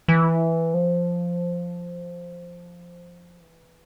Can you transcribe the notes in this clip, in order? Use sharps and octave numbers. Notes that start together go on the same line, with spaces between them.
E3
F3
E3